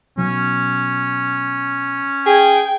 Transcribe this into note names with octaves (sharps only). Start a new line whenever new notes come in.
B2 F#3 C#4
G#4 G5